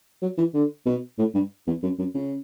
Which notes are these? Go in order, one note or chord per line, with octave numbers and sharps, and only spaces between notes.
F#3
E3
D3
B2
A2
G2
E2
F#2
F#2
C#3